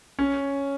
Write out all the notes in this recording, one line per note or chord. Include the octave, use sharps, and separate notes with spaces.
C#4